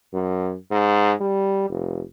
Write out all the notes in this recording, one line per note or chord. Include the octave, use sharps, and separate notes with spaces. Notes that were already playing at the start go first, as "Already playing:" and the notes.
F#2
G#2
G3
F1